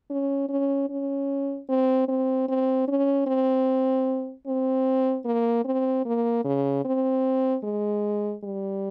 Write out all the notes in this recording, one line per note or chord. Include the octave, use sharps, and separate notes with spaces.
C#4
C#4
C#4
C4
C4
C4
C#4
C4
C4
A#3
C4
A#3
C#3
C4
G#3
G3